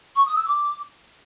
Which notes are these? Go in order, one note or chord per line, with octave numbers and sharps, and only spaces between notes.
C#6
D#6
E6
D6